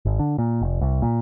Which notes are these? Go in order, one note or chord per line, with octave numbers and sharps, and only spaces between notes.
G#1
D3
A#2
F1
C2
A#2